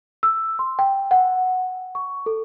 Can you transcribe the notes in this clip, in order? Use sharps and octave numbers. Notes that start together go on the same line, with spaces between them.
E6
C6
G5
F#5
C#6
A4